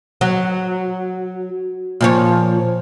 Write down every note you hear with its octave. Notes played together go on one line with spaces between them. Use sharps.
F#3
A#2 F3 C#5